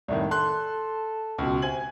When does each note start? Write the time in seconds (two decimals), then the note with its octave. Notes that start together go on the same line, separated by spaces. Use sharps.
0.09 C2 A2 D#3 D4
0.31 A4 C6 F#6
1.38 C#2 B2
1.62 C3 G#5 G#6 F#7